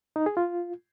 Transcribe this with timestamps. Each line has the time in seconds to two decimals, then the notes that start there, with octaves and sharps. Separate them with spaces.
0.16 D#4
0.26 G#4
0.37 F4